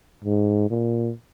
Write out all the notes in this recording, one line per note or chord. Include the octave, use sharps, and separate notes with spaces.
G#2
A#2